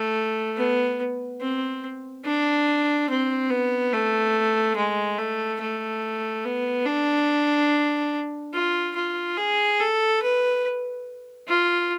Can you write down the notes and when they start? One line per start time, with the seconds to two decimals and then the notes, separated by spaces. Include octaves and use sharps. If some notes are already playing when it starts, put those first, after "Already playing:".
Already playing: A3
0.57 B3
1.41 C4
2.25 D4
3.10 C4
3.50 B3
3.93 A3
4.76 G#3
5.18 A3
5.61 A3
6.45 B3
6.86 D4
8.54 F4
8.96 F4
9.38 G#4
9.80 A4
10.22 B4
11.48 F4